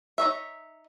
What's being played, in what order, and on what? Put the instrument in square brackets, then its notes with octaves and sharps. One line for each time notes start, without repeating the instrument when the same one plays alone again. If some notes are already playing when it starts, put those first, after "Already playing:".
[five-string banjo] D#4 C#5 E5